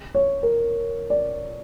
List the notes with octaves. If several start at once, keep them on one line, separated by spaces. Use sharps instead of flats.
C#5
A#4
D5